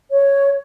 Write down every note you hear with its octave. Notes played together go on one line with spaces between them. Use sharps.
C#5